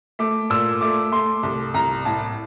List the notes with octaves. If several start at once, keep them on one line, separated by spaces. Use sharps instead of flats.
A3 D6
A#2 E6
A3 D6
A3 C6
C2
C2 A#5
A2 A5